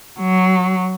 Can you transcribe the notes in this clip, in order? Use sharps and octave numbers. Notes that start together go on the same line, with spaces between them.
F#3